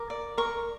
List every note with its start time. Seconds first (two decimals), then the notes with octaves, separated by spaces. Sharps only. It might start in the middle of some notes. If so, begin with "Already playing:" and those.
Already playing: A#4 D6
0.10 D5
0.38 A#4 C#6